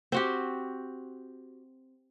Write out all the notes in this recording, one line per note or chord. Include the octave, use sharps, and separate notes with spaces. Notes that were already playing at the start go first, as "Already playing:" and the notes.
C4 F#4 G4